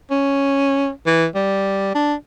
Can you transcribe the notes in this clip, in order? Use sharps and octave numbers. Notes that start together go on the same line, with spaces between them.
C#4
E3
G3
D4